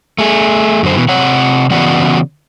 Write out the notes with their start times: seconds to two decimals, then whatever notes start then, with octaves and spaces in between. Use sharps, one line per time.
0.18 A3 G#4
0.83 F#2 D3 C5
0.95 B2 E3
1.09 C3 C#5 F#5
1.70 C#3 E3 B3 F#4 D5 F#5